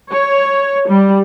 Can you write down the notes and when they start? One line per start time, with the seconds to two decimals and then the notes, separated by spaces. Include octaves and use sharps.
0.10 C#5
0.88 G3